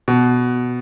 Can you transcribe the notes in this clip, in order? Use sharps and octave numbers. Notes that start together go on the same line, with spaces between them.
B2